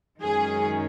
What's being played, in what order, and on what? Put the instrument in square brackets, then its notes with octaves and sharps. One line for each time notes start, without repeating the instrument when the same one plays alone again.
[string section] F#2 D#3 G#3 C#4 G#4